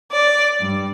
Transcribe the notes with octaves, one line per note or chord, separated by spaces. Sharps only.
D5
G2